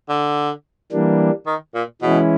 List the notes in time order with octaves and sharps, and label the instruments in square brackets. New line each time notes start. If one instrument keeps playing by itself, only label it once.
[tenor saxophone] D3
[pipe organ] E3 G3 A#3 D4
[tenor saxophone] D#3
A#2
[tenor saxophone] B2 [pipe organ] E3 G#3 C#4 E4